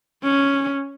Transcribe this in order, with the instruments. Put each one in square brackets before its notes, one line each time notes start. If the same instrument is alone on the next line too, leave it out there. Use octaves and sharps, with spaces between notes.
[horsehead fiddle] C#4